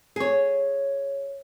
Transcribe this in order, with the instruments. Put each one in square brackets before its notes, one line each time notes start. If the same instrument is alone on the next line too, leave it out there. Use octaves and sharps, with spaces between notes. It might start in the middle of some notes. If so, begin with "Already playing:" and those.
[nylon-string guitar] G#4 C#5